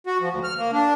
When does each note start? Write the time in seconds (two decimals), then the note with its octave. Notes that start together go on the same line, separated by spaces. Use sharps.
0.07 F#4
0.20 F3
0.32 D2
0.44 F6
0.58 A#3
0.73 D4